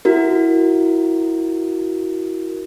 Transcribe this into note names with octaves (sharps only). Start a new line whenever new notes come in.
E4 F#4 A#4